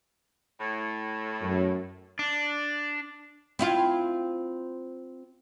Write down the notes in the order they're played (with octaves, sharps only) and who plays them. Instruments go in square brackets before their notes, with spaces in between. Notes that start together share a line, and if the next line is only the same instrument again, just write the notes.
[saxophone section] A2
[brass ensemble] F#2
[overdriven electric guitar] D4
[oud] C4 E4 F4